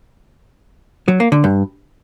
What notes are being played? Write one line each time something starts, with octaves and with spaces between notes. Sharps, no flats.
F#3
A#3
D3
G2